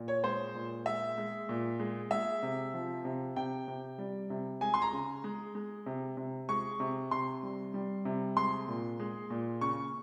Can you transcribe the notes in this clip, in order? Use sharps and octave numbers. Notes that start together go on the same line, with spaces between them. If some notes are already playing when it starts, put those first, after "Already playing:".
Already playing: A#2
C#5
G#3 C5
A#2
G#3 E5
G#3
A#2
G#3
G#3 E5
C3
F3
C3
C3 G5
C3
G3
C3
G#3 G#5
C6
A#5
C#3
G#3
G#3
C3
C3
G#3 C#6
C3
C3 C6
G3
G3
C3
G#3 C6
A#2
G#3
A#2
C#3 C#6